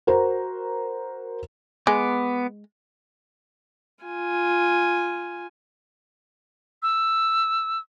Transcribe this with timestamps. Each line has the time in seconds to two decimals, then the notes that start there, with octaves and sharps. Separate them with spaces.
0.07 F#4 A#4 C5 A#5
1.87 G#3 B3 D6
4.04 F4 G#5
6.83 E6